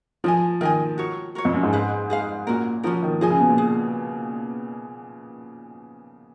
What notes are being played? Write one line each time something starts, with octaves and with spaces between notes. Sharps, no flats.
F3 A#4 D#5 G#5
D#3 A#4 D#5 G#5
F#4 A#4 C#5
F#4 A#4 C#5
F2
F#2
G#2
G#4 B4 F5
G#4 B4 F5
A#2 C#4 F#4 A#4
F3 C#4 F#4 A#4
D#3
F3 G#4 D#5 G#5
C#3
B2
A#2
G#4